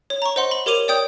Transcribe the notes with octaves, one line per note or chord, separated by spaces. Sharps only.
C#5
A#5 C#6
C5 D#5 F#5 C6
B5 G7
G4 A#4 C#5 D6 D#7 F7
C#5 D5 G5 D#6 G6